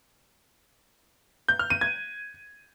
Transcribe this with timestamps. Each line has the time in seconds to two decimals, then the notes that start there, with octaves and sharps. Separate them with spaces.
1.49 G6
1.59 F6
1.70 D#7
1.81 G#6